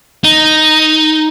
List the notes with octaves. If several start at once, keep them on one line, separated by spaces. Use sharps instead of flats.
D#4